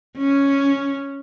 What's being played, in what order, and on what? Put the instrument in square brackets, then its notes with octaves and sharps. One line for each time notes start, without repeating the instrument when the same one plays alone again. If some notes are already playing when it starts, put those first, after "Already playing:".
[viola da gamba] C#4